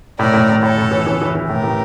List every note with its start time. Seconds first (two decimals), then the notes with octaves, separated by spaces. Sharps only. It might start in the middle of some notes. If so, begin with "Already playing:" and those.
0.19 A2 A#4 D5
0.34 A2
0.49 A2
0.63 A2 A4 C#5
0.78 A2
0.91 E3
1.07 E3
1.22 E3
1.35 E3
1.49 A2 G4 A#4
1.64 A2